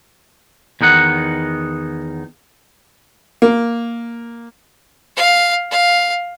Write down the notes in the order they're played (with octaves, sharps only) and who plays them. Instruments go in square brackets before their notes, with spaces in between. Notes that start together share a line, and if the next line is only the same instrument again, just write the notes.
[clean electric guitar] E2 D#3 D#4 F#5
[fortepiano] A#3
[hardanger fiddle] F5
F5